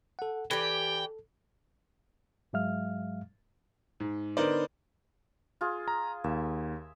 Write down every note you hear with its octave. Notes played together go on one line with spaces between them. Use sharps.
A4 F#5
E3 G4 A4 D5 G5
G#2 F#3 G#3 E5 F5 F6
G#2
D3 B3 D#4 A#4 C5 D5
F4 G#4
A#5
D#2 E5